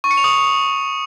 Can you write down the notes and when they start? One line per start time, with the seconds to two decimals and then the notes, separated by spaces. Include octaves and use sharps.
0.04 C#6
0.11 C#7
0.17 F7
0.24 D#6